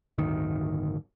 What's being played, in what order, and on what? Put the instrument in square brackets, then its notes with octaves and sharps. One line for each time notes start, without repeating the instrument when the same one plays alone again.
[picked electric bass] D1 G1 D2 D#3